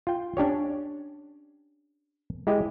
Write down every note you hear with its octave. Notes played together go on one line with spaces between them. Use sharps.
F4 G5
C#4 D4 G4 C#5
G#3 E4 G4 D#5